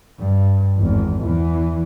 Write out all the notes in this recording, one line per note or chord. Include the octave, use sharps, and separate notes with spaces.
G2
G#1 E2
E2 E3